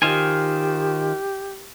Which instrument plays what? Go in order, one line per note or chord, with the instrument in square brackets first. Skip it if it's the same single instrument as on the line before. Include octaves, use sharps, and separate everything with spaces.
[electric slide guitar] D#3 [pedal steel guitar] F4 C5 G#5 [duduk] G4